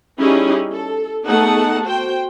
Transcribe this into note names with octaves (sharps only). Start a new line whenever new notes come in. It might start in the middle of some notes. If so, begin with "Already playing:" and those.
G3 C#4 D#4 E4 G4 G#4
A4
A3 B3 D#4 G#4 F#5 A5
F#4 C5 G5